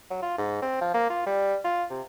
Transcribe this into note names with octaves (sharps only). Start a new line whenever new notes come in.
F#3
F4
G#2
C4
F3
A#3
F4
G3
F4
C3